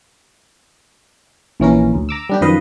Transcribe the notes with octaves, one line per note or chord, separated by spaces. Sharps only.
A#1 E3 C#4 A#4
D2
A#5 D6 E6
G3 D4 G4
F#2 D#3 F3 B4 D#5 F5